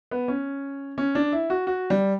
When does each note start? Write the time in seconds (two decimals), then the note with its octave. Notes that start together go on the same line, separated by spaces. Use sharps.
0.11 B3
0.28 C#4
0.98 C#4
1.15 D4
1.32 E4
1.50 F#4
1.67 F#4
1.90 G3